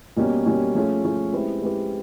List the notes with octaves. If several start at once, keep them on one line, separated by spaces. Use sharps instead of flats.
B2 G3 A#3 C#4
B2 G3 A#3 C#4
F3 A3 C#4 F4 G#4
F3 A3 C#4 F4 G#4
G#3 C4 E4 G4 B4
G#3 C4 E4 G4 B4